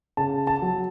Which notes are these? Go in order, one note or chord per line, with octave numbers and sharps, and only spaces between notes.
C#3 A5
A5
F#3